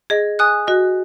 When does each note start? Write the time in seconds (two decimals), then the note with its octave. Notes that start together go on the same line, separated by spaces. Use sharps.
0.10 G#4 D#5
0.39 G#5 D#6 F#6
0.67 F#4 D#5